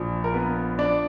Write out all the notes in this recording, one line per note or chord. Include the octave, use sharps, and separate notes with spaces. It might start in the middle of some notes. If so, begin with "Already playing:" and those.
Already playing: A#1 A#2 F3 D4
A#4
B3 B4
D4 D5